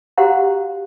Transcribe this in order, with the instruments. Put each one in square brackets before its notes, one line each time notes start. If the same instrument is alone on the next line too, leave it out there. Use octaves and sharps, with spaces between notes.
[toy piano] F#4 G4 C5 F5 F#5 A#5